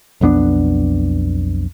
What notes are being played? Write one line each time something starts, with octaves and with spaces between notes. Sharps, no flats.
B1 F2 B3 D4